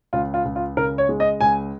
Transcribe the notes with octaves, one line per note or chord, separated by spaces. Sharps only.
C#2 F4
F4
C#2
F4
C#3 A#4
C#5
G#3
D#5
C#2 G#5